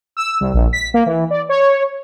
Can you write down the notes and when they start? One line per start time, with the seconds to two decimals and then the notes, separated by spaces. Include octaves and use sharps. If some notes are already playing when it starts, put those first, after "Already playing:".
0.17 E6
0.41 C2
0.54 A#1
0.73 B6
0.94 A#3
1.06 E3
1.30 D5
1.49 C#5